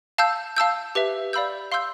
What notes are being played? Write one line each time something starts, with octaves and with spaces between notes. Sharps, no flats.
F5 A5 E6 G6
F5 A5 E6 G6
G4 B4 E5
D5 F5 B5 E6 G6
F5 C6 E6 G6